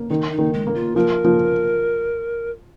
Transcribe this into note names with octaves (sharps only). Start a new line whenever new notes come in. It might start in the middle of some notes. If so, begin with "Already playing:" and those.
Already playing: A#3
D#3 D#4
D#4
D#3
G#3
A#3
F4
F3 A#4
F3